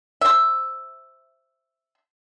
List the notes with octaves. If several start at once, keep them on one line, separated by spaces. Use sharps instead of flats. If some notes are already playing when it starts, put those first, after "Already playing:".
C5 E5